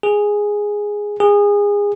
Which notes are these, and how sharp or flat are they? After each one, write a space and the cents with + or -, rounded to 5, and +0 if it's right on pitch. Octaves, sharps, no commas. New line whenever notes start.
G#4 -5
G#4 -25